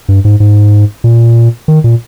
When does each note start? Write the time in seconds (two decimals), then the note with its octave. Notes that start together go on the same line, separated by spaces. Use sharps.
0.09 G2
0.25 G#2
0.40 G#2
1.04 A#2
1.68 D#3
1.84 A#2